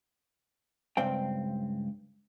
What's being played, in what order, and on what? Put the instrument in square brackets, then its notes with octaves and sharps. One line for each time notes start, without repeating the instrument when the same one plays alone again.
[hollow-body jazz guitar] C#2 G2 C4 G5